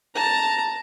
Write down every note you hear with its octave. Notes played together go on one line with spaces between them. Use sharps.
A5 A#5